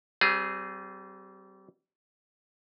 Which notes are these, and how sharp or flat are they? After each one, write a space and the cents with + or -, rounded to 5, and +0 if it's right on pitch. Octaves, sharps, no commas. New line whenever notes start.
G3 -35 C4 -10 G#4 +0